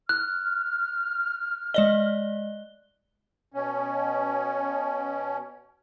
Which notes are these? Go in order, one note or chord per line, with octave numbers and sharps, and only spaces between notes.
F6 F#6
G#3 D5 D#5 G7
B2 C#4